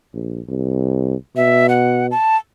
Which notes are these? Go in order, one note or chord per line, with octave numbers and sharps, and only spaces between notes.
A#1
C2
B2 E5
F#5
A5